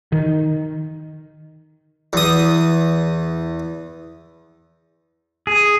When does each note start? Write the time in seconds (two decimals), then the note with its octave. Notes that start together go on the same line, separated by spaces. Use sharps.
0.12 D#3
2.13 E2 D#6
5.47 G#4